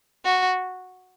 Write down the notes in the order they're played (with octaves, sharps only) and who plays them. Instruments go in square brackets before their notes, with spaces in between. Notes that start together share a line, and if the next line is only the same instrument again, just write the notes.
[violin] F#4